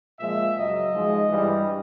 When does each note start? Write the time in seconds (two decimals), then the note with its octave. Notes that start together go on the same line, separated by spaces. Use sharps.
0.19 A#2 F3 G#3 E5
0.56 F#2 C#3 F#3 D#5
0.92 G#2 F3 G#3
1.29 G2 E3 G3